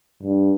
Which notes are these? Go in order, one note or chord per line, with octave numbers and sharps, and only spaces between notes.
G2